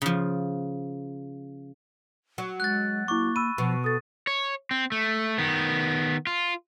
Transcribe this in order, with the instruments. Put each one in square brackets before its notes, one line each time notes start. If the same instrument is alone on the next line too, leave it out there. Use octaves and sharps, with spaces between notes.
[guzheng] C#3 F3
[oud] F#3
[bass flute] G#3 [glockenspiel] F#6 A6
[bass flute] A#3 [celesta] E4 D6 [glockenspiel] C#6
[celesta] B5 E6 [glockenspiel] D#7
[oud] B2 [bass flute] F3
[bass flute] A4 [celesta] D#6 A6
[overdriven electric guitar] C#5
C4
A3
D#3 B3
F4